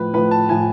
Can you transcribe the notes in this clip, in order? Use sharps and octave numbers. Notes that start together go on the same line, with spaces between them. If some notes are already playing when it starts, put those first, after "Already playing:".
Already playing: A2 F3 B4
A2 F3 B4
A5
A2 F3 G#5